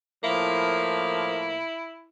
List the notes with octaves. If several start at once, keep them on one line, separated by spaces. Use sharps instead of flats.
A2 F3 A#3 E4